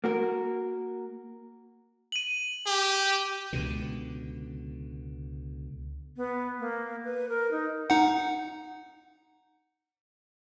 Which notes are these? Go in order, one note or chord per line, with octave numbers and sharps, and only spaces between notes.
A#3 F#4 A#4
D#7 F#7
G4
C#2 B2 D3
B3
A#3
B4
A#4
D#4
D#4 F#5